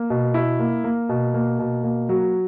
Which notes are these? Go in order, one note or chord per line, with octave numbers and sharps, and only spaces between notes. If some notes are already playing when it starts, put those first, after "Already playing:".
Already playing: A#3
B2
E4
A#3
A#3
B2
A#3
B2
A#3
F#3